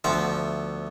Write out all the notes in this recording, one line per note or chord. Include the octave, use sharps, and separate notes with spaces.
D2 F3 B3 E5